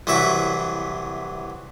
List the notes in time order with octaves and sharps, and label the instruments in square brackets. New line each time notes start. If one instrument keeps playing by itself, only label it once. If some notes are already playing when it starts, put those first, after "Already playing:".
[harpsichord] C2 E3 F#3 E5 C#6